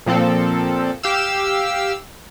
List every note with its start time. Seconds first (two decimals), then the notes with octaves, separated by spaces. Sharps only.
0.06 A#2 F3 C4 A4
1.03 G4 F5 E6